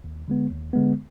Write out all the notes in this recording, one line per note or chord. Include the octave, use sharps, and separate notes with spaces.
D#2
D3 G#3 B3
D#2
D3 G#3 B3